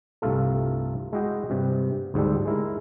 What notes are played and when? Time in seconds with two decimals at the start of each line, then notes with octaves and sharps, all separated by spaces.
0.22 C2 G2 A3 F4 A4
1.13 G#3 E4 F#4 D#5 G5
1.50 G2 C3
2.14 D2 G#2 G3 A4
2.46 G#3 E4 A#4